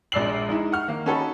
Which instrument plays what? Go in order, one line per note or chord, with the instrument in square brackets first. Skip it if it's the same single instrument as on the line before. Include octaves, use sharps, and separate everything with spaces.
[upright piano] A#1 G#3 D5 E6 C7 F#7
G#3 D#4 E4
F#5 C#6 F6
D#3 A#3
C#4 D#4 F#4 A4 C#5 B5